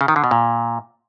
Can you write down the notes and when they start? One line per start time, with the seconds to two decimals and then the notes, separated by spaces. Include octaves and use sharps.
0.01 C#3
0.08 D#3
0.16 D3
0.24 B2
0.31 A#2